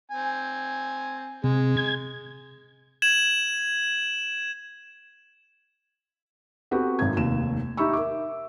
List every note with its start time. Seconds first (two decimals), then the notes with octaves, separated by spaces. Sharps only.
0.12 C4 G#5
1.44 C3 G#3
1.77 G#6
3.02 G#6 E7 F#7
6.71 B3 C4 F#4 G4 A4 B4
6.99 G#1 F#2 G#6
7.17 F1 D#2 E7
7.77 D#4 G4 E5 B5 C#6 E6
7.93 A#4 E5 D6